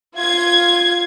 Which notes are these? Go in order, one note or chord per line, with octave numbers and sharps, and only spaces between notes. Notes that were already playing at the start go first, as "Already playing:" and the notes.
F4 G#6